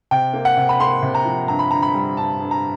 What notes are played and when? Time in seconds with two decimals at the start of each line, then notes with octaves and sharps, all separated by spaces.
0.11 C3 G5
0.33 A#3
0.45 F#5
0.57 C3
0.69 B5
0.80 A#3 C6
1.03 C3
1.15 A#5
1.25 F3
1.48 G2 A#5
1.59 B5
1.71 D3 A#5
1.82 B5
1.94 G3
2.17 G2 A5
2.40 G2
2.51 A#5